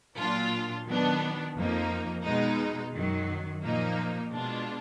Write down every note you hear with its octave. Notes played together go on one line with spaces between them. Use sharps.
A#2 F#3 D4 F4
D#3 F#3 B3 D4
F2 F3 A#3 D#4
B2 G#3 D#4
F#2 D#3 F#3
A#2 F3 A#3 D#4
B2 G#3 D4 F4